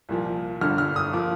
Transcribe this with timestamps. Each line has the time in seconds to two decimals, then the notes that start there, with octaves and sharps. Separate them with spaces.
0.09 C2 A#2 F3 A#3
0.61 G1 G2 D3 F6
0.78 F6
0.96 D#6
1.13 F3 A#3 D6